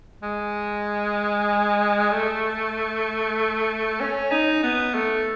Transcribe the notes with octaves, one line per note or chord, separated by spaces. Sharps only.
G#3
A3
C#4
D#4
B3
A3